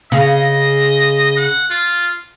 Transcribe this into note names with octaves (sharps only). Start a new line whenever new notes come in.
C#3 D#5
F#5
F4